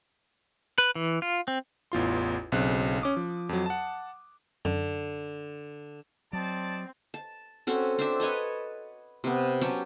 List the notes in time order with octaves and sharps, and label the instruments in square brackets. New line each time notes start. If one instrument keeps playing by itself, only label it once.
[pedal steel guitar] B4
E3
F4
C4
[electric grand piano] A1 E2 F4 C6
B1 C#3 C4 F#6
C#4 D6 D#6
F3
F2 F#3
F#5 A5
[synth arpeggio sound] F#2 [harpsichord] D3
[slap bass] F#3 [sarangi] C4 [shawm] D5 [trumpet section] D#5 A5
[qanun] A5
C4 C#4 F#4 A4
C4 D4 E5
B4 C#5 D#5 A5
C3 B3
F#3 C#4 G4 A5